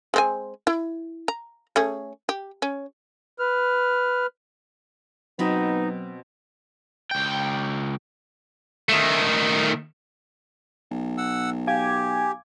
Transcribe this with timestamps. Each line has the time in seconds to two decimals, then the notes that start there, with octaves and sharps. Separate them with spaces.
0.14 G#3 C4 G#5
0.67 E4
1.28 A#5
1.76 A3 C#4 G#4
2.29 G4
2.62 C#4
3.39 B4 F6
5.39 B2 F#3 B3 C4 D#4 B5
7.11 C#2 G5
8.89 D#3 A3
10.91 B1
11.18 F#5 E6
11.67 G4 F5 G#5 D6 G#6